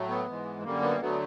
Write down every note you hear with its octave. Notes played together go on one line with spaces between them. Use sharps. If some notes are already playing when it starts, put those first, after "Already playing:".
Already playing: A2 F#3 A3
B3
G#2 E3 G#3
F#2 D3 G3 A#3
B3
D2 D3 F#3 A3 B3